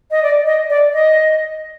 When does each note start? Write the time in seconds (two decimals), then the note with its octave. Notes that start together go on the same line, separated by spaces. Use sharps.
0.11 D#5
0.22 D5
0.45 D#5
0.69 D5
0.93 D#5